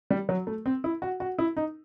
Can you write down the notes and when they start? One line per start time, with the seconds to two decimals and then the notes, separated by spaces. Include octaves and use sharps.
0.10 G3
0.29 F#3
0.47 A3
0.66 C4
0.84 E4
1.02 F#4
1.20 F#4
1.39 E4
1.57 D#4